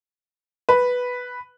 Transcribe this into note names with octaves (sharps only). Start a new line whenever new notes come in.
B4